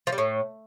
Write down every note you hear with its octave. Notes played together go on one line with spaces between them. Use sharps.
F3
G3
A2